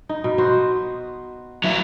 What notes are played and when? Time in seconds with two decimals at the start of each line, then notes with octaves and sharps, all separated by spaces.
0.09 D#4
0.24 B2
0.38 B3 F#4 C5
1.64 F#3 E4